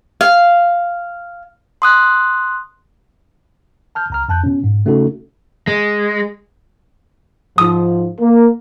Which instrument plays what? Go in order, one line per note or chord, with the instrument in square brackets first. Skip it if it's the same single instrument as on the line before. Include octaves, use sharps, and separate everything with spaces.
[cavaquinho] F5
[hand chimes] C6 D#6 F#6
[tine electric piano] A5 F6 G6
C#2 A#5 F6
F2 A5 F#6 G6
B2 C#4
G#2
C#3 A3 C#4 D#4 F#4 A4
[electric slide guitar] G#3
[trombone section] G#2 F3 [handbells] D#6
[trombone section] A#3